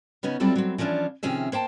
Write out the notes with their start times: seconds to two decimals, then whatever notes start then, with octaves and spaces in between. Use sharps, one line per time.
0.23 C#3 B3 C#4 D#4
0.40 F#3 G3 C4 E4 F4 A4
0.56 F#3 C4
0.78 E3 F3 C#4 D4 F4
1.23 C3 D#3 F3 C#4 G#4 E5
1.52 A#3 C5 G5 A5